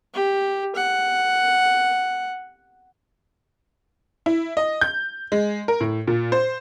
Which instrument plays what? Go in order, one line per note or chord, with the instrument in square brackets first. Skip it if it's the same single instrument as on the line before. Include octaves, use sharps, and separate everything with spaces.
[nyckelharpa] G4
F#5
[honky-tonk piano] E4
D#5
G6
G#3
A#4
A2
A#2
C5